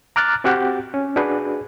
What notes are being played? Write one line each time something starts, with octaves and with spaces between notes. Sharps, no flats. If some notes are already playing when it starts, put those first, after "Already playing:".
A#5 D6 F6 F#6 A6
C4 F#4 G4 F#5
C#4
D4 F#4 G#4 B4